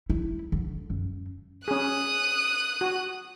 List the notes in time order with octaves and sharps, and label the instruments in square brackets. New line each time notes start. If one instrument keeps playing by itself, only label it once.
[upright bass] E4
D3
F#2
[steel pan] C#4 G#4 [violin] D#6 F#6
[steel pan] F#4